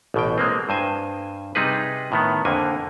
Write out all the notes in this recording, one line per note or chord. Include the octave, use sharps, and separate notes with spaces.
A1 B2 G5
G#3 A#3 C4
G2 C5 G#5
C3 G3 D#4 G#4 B4
A2 D#3 B3
F2 D3 A#3 G#5